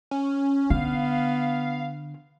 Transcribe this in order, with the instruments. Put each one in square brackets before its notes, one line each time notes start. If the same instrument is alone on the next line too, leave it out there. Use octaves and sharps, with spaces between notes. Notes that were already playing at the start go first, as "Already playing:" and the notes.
[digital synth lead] C#4
[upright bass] D3 [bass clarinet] B3 [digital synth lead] F5